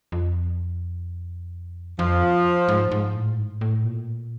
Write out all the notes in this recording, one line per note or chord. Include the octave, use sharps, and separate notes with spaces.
F2
F2 F3
G#2
G#2
A2
G#2
A2
A#2